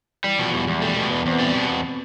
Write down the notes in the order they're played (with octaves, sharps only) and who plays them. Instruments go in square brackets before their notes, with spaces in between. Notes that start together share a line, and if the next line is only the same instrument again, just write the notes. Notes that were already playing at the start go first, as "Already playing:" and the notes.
[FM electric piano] E3 [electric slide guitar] G3
[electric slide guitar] B2 [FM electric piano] F3
[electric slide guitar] E2 [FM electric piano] G3
[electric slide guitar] E2 [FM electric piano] G#3
[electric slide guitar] G3 [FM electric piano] A3
[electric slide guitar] B2 [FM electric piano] A3
[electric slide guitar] E2 [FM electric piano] B3
[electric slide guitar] E2 [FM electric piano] C4
[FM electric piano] B3
[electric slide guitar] G3
B2
E2